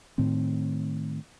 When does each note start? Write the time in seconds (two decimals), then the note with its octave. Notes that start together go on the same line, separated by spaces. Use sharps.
0.18 A2 D#3 C4